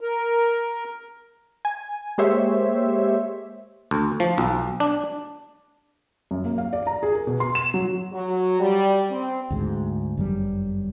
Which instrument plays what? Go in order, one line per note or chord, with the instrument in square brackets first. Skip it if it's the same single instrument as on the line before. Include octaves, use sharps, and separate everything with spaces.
[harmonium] A#4
[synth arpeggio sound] G#5
G#3 A#3 G4 C5 C#5 E5
[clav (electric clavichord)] D2
F3
B1
D4
[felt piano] F#2
A#3
F5
D5
A#5
G#4
A#4
B2
C6
E7
F#3
[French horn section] F#3
G3
C4
[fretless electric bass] D2 G#2
G1 F#2 F#3 G3